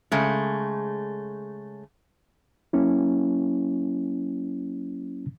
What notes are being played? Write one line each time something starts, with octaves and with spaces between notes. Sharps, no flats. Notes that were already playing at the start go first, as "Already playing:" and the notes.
C#3 G#3 A3
F#3 A#3 C#4 E4